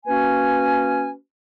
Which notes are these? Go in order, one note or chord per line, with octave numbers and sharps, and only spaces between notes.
A#3 C#4 F#4 B4 G#5